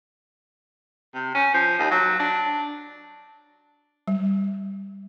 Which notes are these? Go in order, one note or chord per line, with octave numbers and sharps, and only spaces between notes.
C3
C#4
F3
D#2
F#3
D4
G3